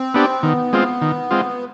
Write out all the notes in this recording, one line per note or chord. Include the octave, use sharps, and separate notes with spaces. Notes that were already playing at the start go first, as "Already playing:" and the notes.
Already playing: C4
B3 D4 G4
D#3 B3
G#3 C4 F4
D#3
G#3 C4 F4